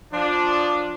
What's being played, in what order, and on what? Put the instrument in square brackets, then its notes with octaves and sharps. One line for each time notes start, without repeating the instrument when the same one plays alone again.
[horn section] F3 D4